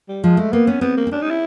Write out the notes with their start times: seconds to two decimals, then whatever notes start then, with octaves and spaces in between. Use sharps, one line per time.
0.09 G3
0.24 F3 G#3
0.37 G#3 A3
0.52 A#3 B3
0.67 B3 C#4
0.81 B3 C4
0.97 A#3
1.07 C4
1.11 C#4 D4
1.22 D#4
1.31 E4